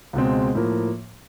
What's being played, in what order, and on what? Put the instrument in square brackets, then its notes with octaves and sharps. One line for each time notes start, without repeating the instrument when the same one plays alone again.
[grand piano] C#2 B2 G#3 C4
A2 F3 A#3